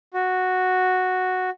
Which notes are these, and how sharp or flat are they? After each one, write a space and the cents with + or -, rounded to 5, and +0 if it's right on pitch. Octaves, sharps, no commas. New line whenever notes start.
F#4 -5